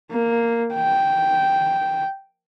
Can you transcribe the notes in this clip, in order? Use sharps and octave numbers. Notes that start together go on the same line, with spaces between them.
A#3
G5